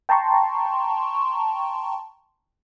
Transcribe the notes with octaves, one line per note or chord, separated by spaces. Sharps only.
G5 A5 A#5 C6 C#6